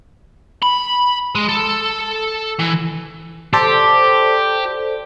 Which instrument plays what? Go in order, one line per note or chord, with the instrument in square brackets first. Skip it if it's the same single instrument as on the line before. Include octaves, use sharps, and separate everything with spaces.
[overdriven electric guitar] B5
G#3
A4
E3
[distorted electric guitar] G4 [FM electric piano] A4 C5 D5